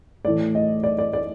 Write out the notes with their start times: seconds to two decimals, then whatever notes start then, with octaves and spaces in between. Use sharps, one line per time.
0.24 A2 E3 A3 D5
0.55 D#5
0.84 D5
0.98 D5
1.13 D5